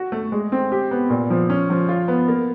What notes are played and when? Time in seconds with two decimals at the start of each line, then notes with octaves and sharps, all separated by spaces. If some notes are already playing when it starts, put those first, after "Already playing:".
Already playing: F#4
0.12 A3
0.32 G#3
0.52 C4
0.72 G4
0.91 B3
1.10 A#2
1.30 F3
1.50 C#4
1.70 F3
1.89 F4
2.08 B3
2.28 A#3